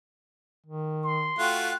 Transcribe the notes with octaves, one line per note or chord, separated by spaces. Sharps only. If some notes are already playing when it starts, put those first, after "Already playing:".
D#3
C6
A3 F4 F#4 G5 F#6